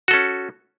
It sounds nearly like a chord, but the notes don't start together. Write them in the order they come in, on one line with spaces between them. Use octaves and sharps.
F#4 A4 C#4